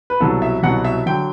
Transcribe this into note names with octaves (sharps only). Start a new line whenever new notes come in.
B4
C2 B2 F#3 A4
E5
C2 B2 F#3 F#5
E5
D3 F#3 G5